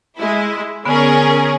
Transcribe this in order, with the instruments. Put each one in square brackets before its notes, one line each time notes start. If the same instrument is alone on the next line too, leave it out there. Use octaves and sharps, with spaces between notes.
[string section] G#3 E4
[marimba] D3 B3 [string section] C#4 G#4 A#4